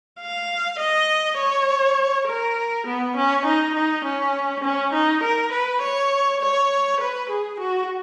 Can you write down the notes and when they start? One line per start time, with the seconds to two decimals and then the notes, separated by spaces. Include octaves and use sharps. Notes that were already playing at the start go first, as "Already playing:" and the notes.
0.20 F5
0.79 D#5
1.38 C#5
2.28 A#4
2.86 B3
3.16 C#4
3.45 D#4
3.75 D#4
4.04 C#4
4.64 C#4
4.93 D#4
5.23 A#4
5.52 B4
5.82 C#5
6.41 C#5
7.01 B4
7.29 G#4
7.60 F#4